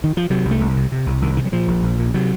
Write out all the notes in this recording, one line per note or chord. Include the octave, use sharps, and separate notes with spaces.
D#3
F3
C3 F#3
C2
A3
C2
C3
C3
C2
C2 D#3
C3 D#3
F#3
A#2 F3
A#1
A#1
A#2
C3 F#3